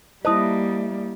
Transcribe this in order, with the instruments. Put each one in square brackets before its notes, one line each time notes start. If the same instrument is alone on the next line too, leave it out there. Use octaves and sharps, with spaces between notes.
[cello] G3 A#3 [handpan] E4 D#5 [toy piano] C5 A5 D#6